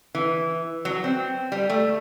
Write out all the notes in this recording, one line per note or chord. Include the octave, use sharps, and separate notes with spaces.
E3
F#3
C4
G3
A3